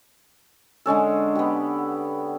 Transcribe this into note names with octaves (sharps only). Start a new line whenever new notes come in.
D3 G#3 C#4 A4
B3 G4